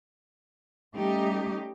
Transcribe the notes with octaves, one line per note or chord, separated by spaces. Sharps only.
G3 A3 C#4 D#4 G4